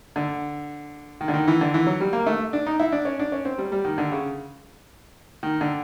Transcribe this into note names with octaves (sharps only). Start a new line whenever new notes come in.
D3
D#3
D3
D#3
E3
D3
E3
F#3
G3
A#3
A3
D4
D#4
E4
D4
C#4
D4
C#4
C4
G3
G3
D#3
D3
C#3
D#3
D3